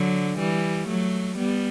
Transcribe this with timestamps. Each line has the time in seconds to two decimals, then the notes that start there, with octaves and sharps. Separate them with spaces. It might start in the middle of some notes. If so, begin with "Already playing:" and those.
Already playing: D3 F#3
0.38 E3 G3
0.88 F#3 A3
1.37 G3 B3